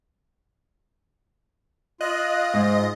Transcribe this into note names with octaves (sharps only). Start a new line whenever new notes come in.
F4 D#5 F#6
G#2